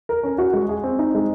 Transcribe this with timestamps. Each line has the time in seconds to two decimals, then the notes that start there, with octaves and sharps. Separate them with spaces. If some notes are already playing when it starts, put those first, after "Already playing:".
0.09 A#4
0.24 C#4
0.38 F#4
0.53 G#3
0.69 G#4
0.84 C4
0.99 D#4
1.15 G#3